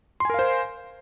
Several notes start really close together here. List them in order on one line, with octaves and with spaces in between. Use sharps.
C6 G#5 A#4 F5 C5